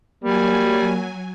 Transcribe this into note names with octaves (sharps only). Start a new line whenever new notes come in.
F#3 G3 A#3 G#5